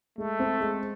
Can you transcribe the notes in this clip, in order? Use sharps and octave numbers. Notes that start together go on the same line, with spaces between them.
G#3 A3
C4
G#3